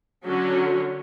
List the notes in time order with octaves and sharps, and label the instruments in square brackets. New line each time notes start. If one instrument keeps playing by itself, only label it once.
[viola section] D3 F#3 C#4